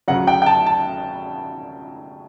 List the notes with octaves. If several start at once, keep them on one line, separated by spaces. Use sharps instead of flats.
D2 C#3 F#3 F#5
G5
G5
A5
A5